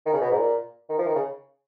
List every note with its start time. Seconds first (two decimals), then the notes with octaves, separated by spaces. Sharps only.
0.06 D#3
0.13 C#3
0.21 B2
0.31 G#2
0.38 A#2
0.89 D#3
0.99 F3
1.07 D#3
1.15 C#3